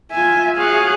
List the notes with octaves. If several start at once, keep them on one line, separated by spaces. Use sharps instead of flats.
F4 E5 G#5
F#4 G#4 C#5 F5 F#6